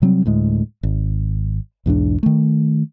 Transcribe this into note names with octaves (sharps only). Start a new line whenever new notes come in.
C3 F#3 G3 C4
D2 A2 G#3
G#1
B1 E2 G#2 D4
D#3 A3